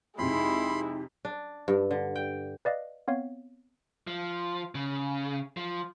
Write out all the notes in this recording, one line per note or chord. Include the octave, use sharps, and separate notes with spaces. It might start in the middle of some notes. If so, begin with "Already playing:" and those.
F2 C3 G#3 D#4 E4 B5 C6
D4
G2
D3
G5
B4 D5 D#5 F5
B3 C4 C#5 F5
F3
C#3
F3